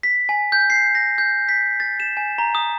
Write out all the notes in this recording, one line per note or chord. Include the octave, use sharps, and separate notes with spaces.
B6
G#5
G6
C7
A#6
G6
B6
A6
E7
G#5
A#5
D#6